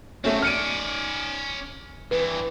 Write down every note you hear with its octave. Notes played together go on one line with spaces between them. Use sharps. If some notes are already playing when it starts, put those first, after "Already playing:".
A3 C4 C#4 F#4
C#4 D5 F6 C#7 D#7
G2 E3 B4